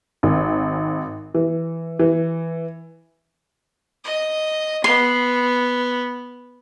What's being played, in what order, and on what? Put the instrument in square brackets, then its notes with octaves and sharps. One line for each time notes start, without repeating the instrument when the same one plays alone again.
[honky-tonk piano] G#1
E3
E3
[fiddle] D#5
[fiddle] B3 [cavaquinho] C6